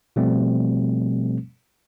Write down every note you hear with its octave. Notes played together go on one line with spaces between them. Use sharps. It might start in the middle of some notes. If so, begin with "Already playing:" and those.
B2 F3 G3 A3 C4